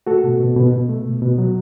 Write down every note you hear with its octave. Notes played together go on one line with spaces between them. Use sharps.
A3 F#4 A4
B2
B2
B2
B2
A3
B2
B2
F#3